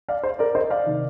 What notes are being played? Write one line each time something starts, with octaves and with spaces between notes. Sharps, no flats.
D5 F5
C5
A#4 D5
C5 D#5
D5 F5
C3 D#3